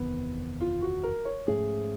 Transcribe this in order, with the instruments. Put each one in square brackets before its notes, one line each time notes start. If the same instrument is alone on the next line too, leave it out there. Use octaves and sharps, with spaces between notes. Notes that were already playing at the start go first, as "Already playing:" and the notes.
Already playing: [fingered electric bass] F#1 E2 C3 D#3 [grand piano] B3
[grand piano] F4
F#4
A#4
C#5
[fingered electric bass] G#2 F3 A3 C#4 [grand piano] G#4